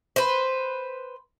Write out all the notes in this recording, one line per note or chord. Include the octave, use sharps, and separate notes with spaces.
B4 C5